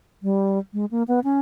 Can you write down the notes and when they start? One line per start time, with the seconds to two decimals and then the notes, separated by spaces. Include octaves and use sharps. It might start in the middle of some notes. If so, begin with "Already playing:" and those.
0.23 G3
0.73 G#3
0.91 A#3
1.08 B3
1.24 C#4